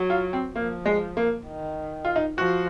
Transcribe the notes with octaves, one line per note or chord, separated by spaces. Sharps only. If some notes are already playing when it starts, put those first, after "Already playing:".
Already playing: F#3
F4
C4
F3 A#3
G#3
A#3
D#3
F4
D#4
F3 F#4